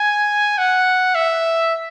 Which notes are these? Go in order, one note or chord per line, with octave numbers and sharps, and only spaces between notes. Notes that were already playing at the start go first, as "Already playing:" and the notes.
Already playing: G#5
F#5
E5